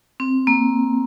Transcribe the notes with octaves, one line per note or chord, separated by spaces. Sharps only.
C4
A#3